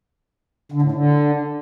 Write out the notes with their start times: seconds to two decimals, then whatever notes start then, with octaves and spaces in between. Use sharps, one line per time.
0.72 D3
0.82 A2
0.92 D3